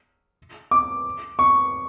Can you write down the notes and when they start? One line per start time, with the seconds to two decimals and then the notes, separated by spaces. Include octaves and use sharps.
0.71 D6
1.39 C#6